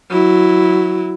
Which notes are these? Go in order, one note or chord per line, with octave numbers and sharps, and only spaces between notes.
F#3 E4